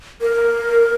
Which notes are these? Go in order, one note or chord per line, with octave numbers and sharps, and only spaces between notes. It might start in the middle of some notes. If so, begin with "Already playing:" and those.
A#4